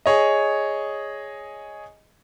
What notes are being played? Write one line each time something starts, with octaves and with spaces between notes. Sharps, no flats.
G#4 C#5 D#5